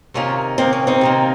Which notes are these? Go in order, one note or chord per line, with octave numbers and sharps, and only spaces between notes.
C3 D#3 A#3 C#4 F4
C3 D#3 A#3 C4
C#4
C4 D#4
C3 D#3 A#3